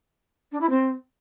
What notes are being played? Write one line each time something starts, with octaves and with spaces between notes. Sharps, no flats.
D4
E4
C4